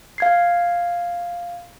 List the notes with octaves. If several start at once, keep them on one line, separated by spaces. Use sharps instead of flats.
F5 G#6 C7